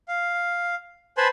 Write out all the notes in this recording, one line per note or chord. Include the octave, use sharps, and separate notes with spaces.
F5
B4 C5 G#5 A5 B5 C6